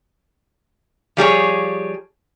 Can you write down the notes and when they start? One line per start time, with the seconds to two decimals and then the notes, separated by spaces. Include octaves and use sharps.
1.17 F3 G3 G#4 C#5